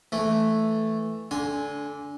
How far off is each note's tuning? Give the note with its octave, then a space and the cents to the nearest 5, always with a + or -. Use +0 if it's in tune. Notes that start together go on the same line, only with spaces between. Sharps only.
E3 +0 A3 +0
D3 -20 G#5 +0 C6 +0